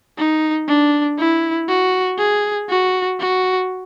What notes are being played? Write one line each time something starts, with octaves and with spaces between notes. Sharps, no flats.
D#4
D4
E4
F#4
G#4
F#4
F#4